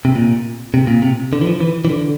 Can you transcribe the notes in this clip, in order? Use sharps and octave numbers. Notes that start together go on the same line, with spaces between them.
C3
A#2
C3
A#2
C3
D3
E3
F3
E3
E3
D3